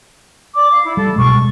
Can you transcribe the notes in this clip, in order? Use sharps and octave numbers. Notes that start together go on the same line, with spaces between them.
D5 D6
F5
E4
G3 A4
C#2 B2 G#3 C#6